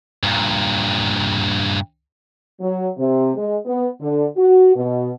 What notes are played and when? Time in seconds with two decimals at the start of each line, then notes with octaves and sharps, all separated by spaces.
0.23 G2 A#2
2.60 F#3
2.97 C3
3.35 G#3
3.65 B3
4.01 D3
4.37 F#4
4.75 B2